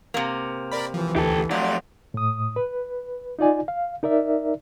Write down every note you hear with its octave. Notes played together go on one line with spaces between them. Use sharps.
C3 A#3
A#4 D5 B5
E3 F3
D2 G4 A4
F3 F#3 A3 D5
A2 D#6
B4
D#4 F4 D5 G#5
F5
D#4 A#4 D5 E5